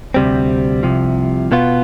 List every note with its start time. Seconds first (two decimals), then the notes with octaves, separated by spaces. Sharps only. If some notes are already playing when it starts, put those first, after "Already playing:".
0.14 D2 C3 G3 C4
0.83 C2 C3 F3
1.52 B2 B3 F4